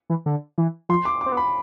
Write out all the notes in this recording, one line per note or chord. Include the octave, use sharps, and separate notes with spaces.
E3
D3
E3
F3 C6
D6
D6
C4
B3
B5